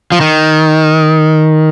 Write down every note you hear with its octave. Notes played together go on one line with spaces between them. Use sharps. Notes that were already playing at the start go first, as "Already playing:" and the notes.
F3
D#3